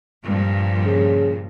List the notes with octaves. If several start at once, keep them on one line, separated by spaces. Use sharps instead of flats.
G2 A#2 F3
C#3